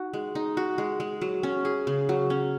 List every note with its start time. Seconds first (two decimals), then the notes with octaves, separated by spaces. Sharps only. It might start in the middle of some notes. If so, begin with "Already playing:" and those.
Already playing: D#4 F#4
0.13 G#3
0.35 D#4
0.57 F#4
0.78 G#3
1.00 G#3
1.21 F#3
1.43 C#4
1.65 G#4
1.87 C#3
2.09 F#3
2.30 C#4